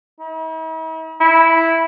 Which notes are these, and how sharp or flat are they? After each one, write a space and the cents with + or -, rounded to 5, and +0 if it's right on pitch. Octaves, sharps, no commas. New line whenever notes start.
E4 -45
E4 -5